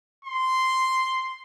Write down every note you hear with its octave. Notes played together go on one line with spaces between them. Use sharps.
C6